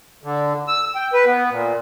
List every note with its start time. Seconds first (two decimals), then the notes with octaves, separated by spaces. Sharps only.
0.24 D3
0.68 E6
0.95 G5
1.13 B4
1.26 B3
1.50 A#2